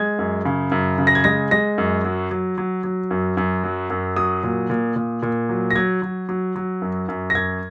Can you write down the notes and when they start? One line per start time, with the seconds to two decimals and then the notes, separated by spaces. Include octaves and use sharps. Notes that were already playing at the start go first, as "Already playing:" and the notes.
Already playing: G#3 G#6
0.19 F#2
0.45 C#3
0.72 F#2
0.98 C#3
1.07 A#6
1.15 G#6
1.24 G#3 A#6
1.51 G#3 A#6
1.78 F#2
2.04 F#3
2.31 F#3
2.58 F#3
2.84 F#3
3.11 F#2
3.37 F#2
3.64 F#3
3.90 F#2
4.16 F#3 D#6
4.43 A#2
4.70 A#2
4.96 A#2
5.22 A#2
5.49 F#3
5.71 A#6
5.76 F#3 G#6
6.02 F#3
6.29 F#3
6.56 F#3
6.82 F#2
7.08 F#2
7.30 A#6
7.35 F#2 G#6